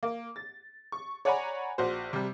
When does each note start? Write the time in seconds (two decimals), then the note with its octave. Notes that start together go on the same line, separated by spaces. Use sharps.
0.03 A#3
0.36 A6
0.92 C#6
1.25 C#5 D5 F#5 G#5 A#5 B5
1.78 A#1 F#4 C5
2.13 C3 G3